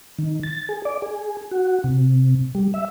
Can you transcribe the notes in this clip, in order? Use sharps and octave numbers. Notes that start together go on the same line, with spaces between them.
D#3
A6
G#4
D5
G#4
F#4
C3
G3
E5